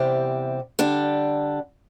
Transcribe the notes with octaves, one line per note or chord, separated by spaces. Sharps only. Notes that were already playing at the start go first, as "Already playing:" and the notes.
Already playing: E2 C3 G3 C4 G4
D3 G3 D4 G4